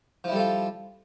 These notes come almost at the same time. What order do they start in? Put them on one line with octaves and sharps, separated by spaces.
F3 E4 G3 A4 F4